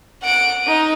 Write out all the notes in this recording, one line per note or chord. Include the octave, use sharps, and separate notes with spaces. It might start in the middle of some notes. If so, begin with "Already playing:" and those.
F#5 D7
D#4 D#7